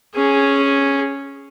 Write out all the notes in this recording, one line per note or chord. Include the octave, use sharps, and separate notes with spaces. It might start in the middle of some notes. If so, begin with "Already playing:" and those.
C#4 G#4